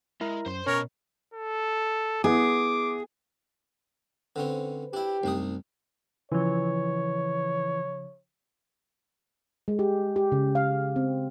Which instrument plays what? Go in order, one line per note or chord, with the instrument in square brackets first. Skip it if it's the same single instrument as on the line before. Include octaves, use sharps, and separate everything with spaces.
[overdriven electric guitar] G#3 [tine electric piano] E4 A#4 A#5
[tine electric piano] F#2 [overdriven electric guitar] C5 C6
[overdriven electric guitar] B2 [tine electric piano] C#4 [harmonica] A#4 C#5
[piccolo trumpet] A4
[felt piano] B3 E4 [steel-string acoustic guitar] G#4 [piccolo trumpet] D6
[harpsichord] D3 C4 C#4 [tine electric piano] B4 C5
[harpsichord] D4 E4 [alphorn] G4
[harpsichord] C2 D4 D#6 [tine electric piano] F#2 A3 D#4
[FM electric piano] C#3 F3 [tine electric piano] E3 [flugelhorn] C#5
[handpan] G#3
G4
G4
C#3
F5
C4